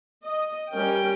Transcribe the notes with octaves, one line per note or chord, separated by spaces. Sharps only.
D#5
G3 C#4 A#4 G5